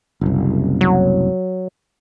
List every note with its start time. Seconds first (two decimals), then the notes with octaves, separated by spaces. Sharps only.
0.21 F#1 C2
0.81 F#3